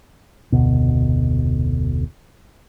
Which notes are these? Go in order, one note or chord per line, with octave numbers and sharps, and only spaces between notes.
F1 D2 B2